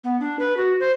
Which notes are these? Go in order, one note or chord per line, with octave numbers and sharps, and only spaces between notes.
B3
D4
B4
F#4
C5